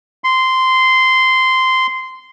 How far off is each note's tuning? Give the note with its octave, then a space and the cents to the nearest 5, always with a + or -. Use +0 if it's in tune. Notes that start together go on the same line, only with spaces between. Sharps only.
C6 -10